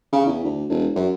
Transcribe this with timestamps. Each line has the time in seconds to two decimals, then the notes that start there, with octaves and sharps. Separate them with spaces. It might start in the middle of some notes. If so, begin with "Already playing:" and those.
0.12 C#3
0.26 E2
0.44 D2
0.69 E1
0.96 F#2